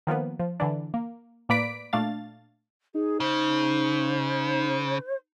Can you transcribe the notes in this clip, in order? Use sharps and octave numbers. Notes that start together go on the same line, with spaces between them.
D#3 F3 A#3 B3
F3
D3 E3 D4
A#3
A2 A#3 B4 D5 B6 D7
A#2 A3 D4 F5 A6
D#4 G#4
C#3 C5